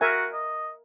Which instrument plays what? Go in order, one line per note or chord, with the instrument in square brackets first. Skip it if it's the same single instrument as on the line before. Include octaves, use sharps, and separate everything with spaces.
[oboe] F#4 [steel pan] A#4 E5 G#5
[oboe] D#5